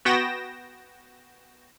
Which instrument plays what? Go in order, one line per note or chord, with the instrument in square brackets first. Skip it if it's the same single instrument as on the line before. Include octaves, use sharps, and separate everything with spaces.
[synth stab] B3 F#4 G5 A#6 E7